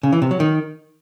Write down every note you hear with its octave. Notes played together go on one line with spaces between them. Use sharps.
C#3
E3
C3
F#3
D#3